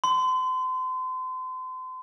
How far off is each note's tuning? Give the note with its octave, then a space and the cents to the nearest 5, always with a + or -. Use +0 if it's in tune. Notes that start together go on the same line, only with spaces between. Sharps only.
C6 -35